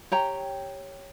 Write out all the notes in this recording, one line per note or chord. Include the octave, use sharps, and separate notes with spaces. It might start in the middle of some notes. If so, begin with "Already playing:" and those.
G4 C#5 G5 A#5